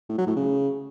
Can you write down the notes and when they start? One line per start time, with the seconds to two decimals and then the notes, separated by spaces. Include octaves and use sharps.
0.09 A2
0.18 F#3
0.27 A2
0.36 C#3